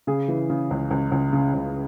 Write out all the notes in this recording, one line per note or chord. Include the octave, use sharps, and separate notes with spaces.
C#3 G#4
E3
C#3
C#2
C#2
C#2
C#3
C#2